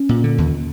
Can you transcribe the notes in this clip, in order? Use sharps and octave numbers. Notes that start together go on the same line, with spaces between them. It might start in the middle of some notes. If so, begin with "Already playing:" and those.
Already playing: C#4
A#2
D3
D#2